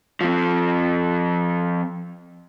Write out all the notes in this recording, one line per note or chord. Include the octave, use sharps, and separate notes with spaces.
F3 C4